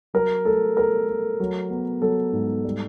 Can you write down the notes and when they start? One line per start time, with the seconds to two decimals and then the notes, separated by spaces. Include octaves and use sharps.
0.14 F#3 A#4
0.45 A3 A4
0.77 A3 A#4
1.08 A3
1.40 F#3
1.70 B3
2.02 F#3 A4
2.33 G#2
2.64 G3